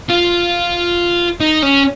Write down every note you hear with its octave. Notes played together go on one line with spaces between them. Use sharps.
F4
D#4
C#4